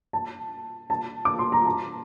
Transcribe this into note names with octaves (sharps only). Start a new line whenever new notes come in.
A5
A5
D6
C6
A#5
A5